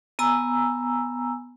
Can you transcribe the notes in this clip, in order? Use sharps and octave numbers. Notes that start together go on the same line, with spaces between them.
B3 G#5 A#5 E6